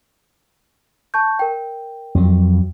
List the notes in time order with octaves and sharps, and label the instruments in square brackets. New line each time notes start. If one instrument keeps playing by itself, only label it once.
[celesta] A5 C#6 G6
A#4 G5
[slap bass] F2 F#3